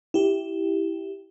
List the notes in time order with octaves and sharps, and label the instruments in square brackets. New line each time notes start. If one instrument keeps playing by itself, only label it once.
[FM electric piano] E4 G4